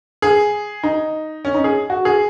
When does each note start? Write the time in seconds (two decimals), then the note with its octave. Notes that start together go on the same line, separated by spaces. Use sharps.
0.22 G#4
0.83 D#4
1.45 C#4
1.54 D#4
1.64 G#4
1.90 F#4
2.05 G#4